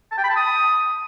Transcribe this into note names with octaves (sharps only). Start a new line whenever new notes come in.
A5
G5
B5
A5
D#6